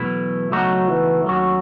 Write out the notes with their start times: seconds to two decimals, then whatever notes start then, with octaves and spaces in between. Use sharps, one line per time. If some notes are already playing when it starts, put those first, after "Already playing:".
Already playing: B1 B2 E3 A3 E4
0.52 C#2 B2 F#3 A3 D#4 F#4
0.88 E3
1.25 D#2 D#3 F#3 A3 C#4 F#4